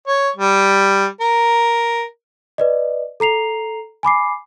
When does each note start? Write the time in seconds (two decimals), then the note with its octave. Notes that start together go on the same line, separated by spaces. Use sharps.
0.07 C#5
0.36 G3
1.21 A#4
2.58 B4 D5 D#5
3.20 A4 A#5 C7 F7
4.03 G#5 B5 D6 C7